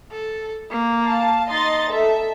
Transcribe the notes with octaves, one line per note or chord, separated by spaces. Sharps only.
A4
A#3
F5 A5
D#4 D#5 C6 A6
A4 E5